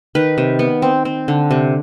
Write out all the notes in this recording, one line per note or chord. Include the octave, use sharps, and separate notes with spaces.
D#3 B4
C3
B3
C4
C4
D3
C3